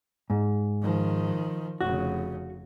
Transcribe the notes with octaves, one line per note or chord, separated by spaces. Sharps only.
G#2
D#3 F3
F1 C#3 F#4